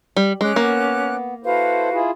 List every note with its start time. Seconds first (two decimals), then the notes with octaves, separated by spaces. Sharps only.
0.16 G3
0.41 G#3 C#4 D6 F#6
0.56 A#3 B3
1.44 E4 F#4 A4 B4 C5 F5
1.92 E4 F4 G#4